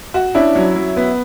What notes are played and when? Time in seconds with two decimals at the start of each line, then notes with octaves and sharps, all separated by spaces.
0.14 F#4
0.35 C#4 D4 E4
0.55 F#3
0.76 F#3
0.97 B3